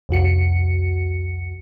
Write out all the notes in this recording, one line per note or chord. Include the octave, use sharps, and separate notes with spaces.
C2 F2 F#4 C#7